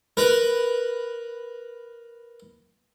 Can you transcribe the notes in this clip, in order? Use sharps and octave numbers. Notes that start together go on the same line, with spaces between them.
A#4 B4